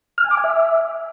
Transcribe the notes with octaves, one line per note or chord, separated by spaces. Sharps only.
F6
G#5
D6
G#5
E5